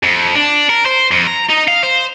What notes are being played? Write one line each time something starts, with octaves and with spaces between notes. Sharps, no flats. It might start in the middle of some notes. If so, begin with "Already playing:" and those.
F2
D4
A#4
C5
F2
A#5
D#4
F5
C5